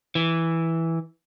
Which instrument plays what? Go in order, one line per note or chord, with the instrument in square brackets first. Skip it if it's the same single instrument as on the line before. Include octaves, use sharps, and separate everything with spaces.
[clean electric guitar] E3